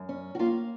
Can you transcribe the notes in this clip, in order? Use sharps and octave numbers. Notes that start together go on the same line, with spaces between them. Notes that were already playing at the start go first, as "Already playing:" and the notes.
Already playing: F#2
C#4
F#4
A#3 F4